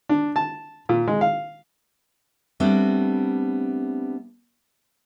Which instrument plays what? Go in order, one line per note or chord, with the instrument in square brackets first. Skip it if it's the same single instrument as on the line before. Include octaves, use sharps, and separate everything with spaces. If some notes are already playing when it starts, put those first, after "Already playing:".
[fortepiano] D4
A5
A#2
G#3
F5
[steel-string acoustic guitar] G3 A3 B3 C4 D4